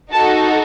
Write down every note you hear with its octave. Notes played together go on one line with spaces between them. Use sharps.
D#4 F#4 A4 A5